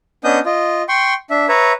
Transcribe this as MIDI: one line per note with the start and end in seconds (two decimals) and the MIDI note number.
0.24 0.39 59
0.24 0.39 61
0.24 0.39 62
0.24 0.39 75
0.24 0.39 87
0.24 0.39 91
0.46 0.82 65
0.46 0.82 75
0.89 1.14 79
0.89 1.14 84
0.89 1.14 85
1.30 1.46 62
1.30 1.46 76
1.49 1.72 71
1.49 1.72 73
1.49 1.72 76
1.49 1.72 82